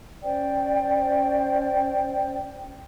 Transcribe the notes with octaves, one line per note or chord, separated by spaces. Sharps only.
C#4 C5 D5 G5